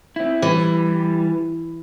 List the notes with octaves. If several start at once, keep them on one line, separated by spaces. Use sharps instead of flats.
C4 E4
E3 G3